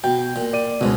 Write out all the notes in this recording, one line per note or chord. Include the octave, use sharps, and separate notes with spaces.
B2 G5
A#2
D5 D#7
C#2 G#2 B2 G#3